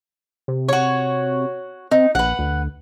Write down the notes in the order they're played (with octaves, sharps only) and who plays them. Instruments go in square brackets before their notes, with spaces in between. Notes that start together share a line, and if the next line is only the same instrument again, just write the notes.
[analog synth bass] C3
[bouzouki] F#4 C#5
[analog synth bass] C4 [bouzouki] D#4
[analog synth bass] A#1 [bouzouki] B4 F#5
[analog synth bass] D2